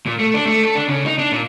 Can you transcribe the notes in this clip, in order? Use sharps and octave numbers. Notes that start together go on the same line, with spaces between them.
A#2
A3
D4
A3
A4
D4
C#3
D#4
D4
A#2